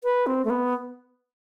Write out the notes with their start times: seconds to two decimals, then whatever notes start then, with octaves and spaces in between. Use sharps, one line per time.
0.04 B4
0.27 C4
0.45 A3
0.50 B3